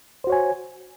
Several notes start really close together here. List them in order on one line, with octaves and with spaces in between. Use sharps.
C5 F#4 C#5 G#5